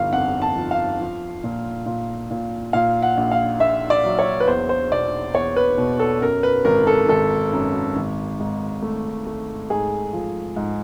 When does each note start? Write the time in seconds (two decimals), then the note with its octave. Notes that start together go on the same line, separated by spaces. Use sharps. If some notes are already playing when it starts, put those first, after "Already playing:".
Already playing: G1 F3 F5
0.13 F2 F#5
0.42 A5
0.56 F3
0.71 F5
0.99 F3
1.44 A#2
1.86 A#2
2.30 A#2
2.73 A#2 F5
3.03 F#5
3.17 A#1
3.32 F5
3.60 A#1 E5
3.90 D5
4.05 F#3
4.19 C#5
4.40 B4
4.47 E2 C5
4.69 C5
4.91 B2 D5
5.34 E2 C#5
5.56 B4
5.78 B2
5.99 A4
6.22 F#2 A#4
6.43 B4
6.65 G#1 A#4
6.87 A4
7.09 G#1 A4
7.53 F#2
7.96 G#1
8.40 G#2
8.82 A3
9.26 A3
9.70 G#2 G#4
10.13 F3
10.56 G#2